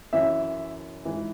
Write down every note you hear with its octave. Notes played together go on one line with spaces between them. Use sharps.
F#2 E3 E5
G#2 E3